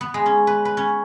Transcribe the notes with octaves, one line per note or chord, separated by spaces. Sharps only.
B3
G#3
C#4
B4
B4
C#4